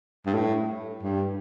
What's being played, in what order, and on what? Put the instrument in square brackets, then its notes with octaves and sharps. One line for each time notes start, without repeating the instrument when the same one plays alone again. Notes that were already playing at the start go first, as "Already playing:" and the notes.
[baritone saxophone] G2
A2
G2